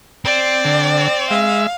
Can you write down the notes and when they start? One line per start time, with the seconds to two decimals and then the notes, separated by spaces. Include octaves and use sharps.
0.25 C4 D5
0.65 D3
1.31 G#3 E5 F5